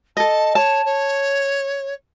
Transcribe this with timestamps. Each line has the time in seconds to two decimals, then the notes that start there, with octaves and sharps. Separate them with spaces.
0.17 A4 D#5 A5
0.55 C#5 A5
0.84 C#5